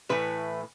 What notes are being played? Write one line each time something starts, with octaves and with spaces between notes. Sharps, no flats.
A2 E3 A3 B4